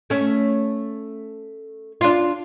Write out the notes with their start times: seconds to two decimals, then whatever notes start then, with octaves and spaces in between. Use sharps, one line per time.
0.10 A3 C#4
2.01 D4 F4